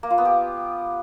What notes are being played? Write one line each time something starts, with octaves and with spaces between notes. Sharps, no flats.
A#3
F4
B3
G4